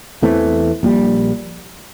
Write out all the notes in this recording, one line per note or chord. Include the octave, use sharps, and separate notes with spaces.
E2 E3 A3 C4
A#1 A#2 G3